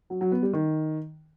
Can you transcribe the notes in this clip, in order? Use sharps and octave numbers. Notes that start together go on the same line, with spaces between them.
F#3
F#3
B3
G3
D#3